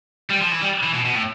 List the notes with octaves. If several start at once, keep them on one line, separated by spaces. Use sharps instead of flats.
G3
F3
E3
G3
E3
B2
B2
A2